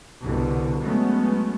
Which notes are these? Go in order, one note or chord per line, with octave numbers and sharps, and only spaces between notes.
C2 B2 D3
F#3 G#3 A3 B3 C#4